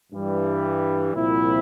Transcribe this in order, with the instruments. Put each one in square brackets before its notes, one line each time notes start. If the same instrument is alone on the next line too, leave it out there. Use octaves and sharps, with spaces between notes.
[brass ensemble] G2 E3 G3
C2 A#2 F3 C4 E4